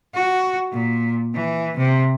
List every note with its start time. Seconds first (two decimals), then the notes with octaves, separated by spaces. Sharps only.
0.14 F#4
0.72 A#2
1.34 E3
1.77 C3